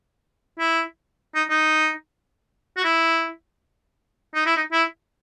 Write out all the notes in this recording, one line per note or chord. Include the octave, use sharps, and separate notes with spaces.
E4
D#4
D#4
F#4
E4
D#4
E4
D#4
E4